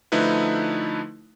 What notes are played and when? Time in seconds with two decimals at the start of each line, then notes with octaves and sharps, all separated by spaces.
0.12 D3 F3 A3 D#4 E4 B4